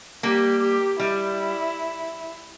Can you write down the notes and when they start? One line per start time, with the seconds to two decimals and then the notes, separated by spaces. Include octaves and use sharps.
0.23 G3 A#3 G4
0.62 G4
0.99 G3 E4